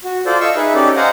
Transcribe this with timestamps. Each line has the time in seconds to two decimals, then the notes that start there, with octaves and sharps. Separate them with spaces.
0.04 F#4
0.26 F4 A4 C5 D5
0.40 A4 D#5 F5 C#6 E6
0.56 D#4 G#4 B4 E5
0.74 C#4 D#4 G4 A4 D5
0.96 C5 D#5 F5 F#5 G#5 A#5